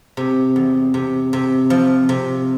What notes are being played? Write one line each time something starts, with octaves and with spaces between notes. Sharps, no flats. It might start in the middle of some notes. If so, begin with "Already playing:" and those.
C3
E2
C3
C3
F3
C3